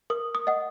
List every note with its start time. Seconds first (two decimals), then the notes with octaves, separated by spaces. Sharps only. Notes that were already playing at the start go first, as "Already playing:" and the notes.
0.10 A#4 D#6
0.35 D#6
0.47 D#5 F#5